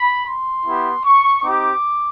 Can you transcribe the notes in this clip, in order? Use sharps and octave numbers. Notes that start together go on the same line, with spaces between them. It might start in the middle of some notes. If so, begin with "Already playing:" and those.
Already playing: B5
C6
B3 E4 G4
C#6
C4 D#4 G4 D6